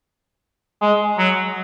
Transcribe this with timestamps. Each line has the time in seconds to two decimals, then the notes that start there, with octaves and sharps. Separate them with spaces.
0.81 G#3
1.18 F#3